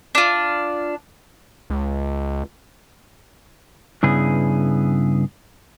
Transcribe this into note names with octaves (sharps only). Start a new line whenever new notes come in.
D4 F4
C#2
G2 C#3 B3 E4 G#4